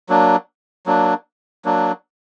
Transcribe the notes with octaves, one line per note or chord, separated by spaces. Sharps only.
F#3 A#3 D4
F#3 A#3 D4
F#3 A#3 D4